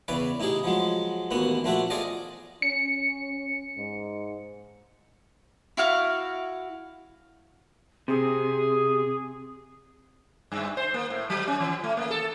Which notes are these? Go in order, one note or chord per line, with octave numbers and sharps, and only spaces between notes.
E2 C#3 C#4 B4 D5
A2 D#4 E4 G4 G#4
F3 F#3 G#3
A1 D#2 A#3 B3 F#4
A#1 A3 C4 D4 F#4 E5
F4 G#4 A4 C5 D5 D#5
C#4 C#7
G#2
E4 F#4 F5 F6
C3 G#4
G2
C5
A#3
A2
F#3
C#4
E3
A3
A#3
A4